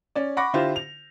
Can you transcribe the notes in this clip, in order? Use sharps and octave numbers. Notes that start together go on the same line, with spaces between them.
C#4 D5
F#5 B5 C#6 D6 A#6
D3 E4 F4 G4 C5
F7